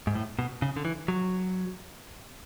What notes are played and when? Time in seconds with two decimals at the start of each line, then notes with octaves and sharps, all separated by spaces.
0.07 G#2
0.15 A2
0.39 B2
0.62 C#3
0.76 D3
0.85 E3
1.08 F#3